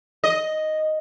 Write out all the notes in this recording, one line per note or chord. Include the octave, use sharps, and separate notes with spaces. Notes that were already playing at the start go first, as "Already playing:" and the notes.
D#5